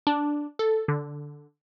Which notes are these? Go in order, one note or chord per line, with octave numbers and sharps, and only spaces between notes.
D4
A4
D3